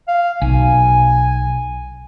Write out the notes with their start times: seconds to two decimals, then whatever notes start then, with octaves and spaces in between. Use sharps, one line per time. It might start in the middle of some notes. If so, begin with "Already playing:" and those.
0.08 F5
0.42 B1 G#5